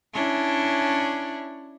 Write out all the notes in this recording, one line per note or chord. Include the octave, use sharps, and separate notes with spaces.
C#4 D4 E4